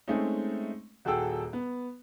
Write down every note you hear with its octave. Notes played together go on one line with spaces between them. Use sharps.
G#3 A3 C4 C#4 D#4
D#1 F#4 G#4 A4 G5 E6
B3